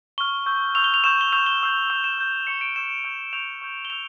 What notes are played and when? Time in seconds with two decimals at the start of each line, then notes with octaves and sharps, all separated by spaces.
0.18 C#6 F6 G7
0.46 C#6 E6 G6
0.75 C#6 E6 G6 F7
0.84 G7
0.94 F7
1.04 C#6 E6 G6 E7
1.21 G7
1.33 C#6 E6 G6 F7
1.46 G7
1.61 C#6 E6 G6
1.90 C#6 E6 G6 F7
2.04 E7
2.18 C#6 E6 G6
2.47 C#6 E6 G6 C#7
2.61 D7
2.76 C#6 E6 G6 E7
3.04 C#6 E6 G6
3.33 C#6 E6 G6 F7
3.61 C#6 E6 G6
3.85 G7
3.90 E6 G6 F7